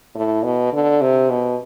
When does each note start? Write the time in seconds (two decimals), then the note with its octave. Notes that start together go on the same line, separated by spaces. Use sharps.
0.15 A2
0.43 B2
0.73 D3
1.01 C3
1.30 B2